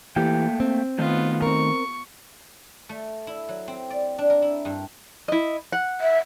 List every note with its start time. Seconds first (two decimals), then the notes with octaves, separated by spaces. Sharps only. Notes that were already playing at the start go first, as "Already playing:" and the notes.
0.16 E3 A3 A#3 G4 G5
0.60 C4
0.99 D#3 A3 B3 F4
1.42 C4 A#4 C#6
2.89 A3
3.27 E4
3.49 F#3
3.68 C4
3.90 D5
4.18 D4
4.30 A#4
4.42 E4
4.65 G2
5.28 E4 D#5
5.72 F#5
6.01 E5